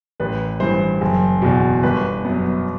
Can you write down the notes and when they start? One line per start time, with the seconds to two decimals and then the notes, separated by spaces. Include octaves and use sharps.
0.20 A1 B4
0.60 G2 E3 C5
1.01 F#1
1.42 E2 B2
1.83 G1 B4
2.24 F#2 F#3 B3